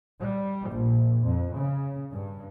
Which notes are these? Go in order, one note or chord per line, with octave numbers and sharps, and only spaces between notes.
G3
A#1
F2
C#3
G2